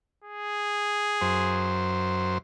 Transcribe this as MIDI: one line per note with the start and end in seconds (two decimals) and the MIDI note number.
0.25 1.87 68
1.21 2.38 42
1.21 2.38 72